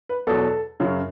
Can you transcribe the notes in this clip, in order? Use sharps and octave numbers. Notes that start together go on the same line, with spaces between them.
B4
E2 B2 F#3 A4
F#2 C#3 F#3